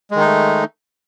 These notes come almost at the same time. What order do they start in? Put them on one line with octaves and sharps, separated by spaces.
G#3 D#3 D#4 A3